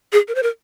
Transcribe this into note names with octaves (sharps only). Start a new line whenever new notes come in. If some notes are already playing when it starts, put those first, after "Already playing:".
G#4
A#4
C5
A#4